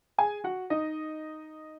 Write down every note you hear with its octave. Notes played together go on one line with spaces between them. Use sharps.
G#4 G#5
F#4 F#5
D#4 D#5